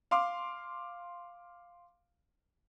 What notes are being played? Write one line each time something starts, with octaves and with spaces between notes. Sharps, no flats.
F5 C6 D6